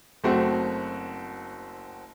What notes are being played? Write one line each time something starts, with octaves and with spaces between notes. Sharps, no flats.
F#1 A3 C4 F#4